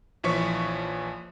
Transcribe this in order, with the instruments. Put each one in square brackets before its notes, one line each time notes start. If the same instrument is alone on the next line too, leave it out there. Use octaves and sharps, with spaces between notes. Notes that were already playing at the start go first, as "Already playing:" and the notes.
[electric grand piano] A#1 E3 F3 C#5 C#6 B6